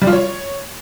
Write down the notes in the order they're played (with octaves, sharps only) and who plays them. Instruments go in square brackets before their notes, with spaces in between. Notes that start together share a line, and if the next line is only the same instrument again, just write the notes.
[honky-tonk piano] G3
F4
C#5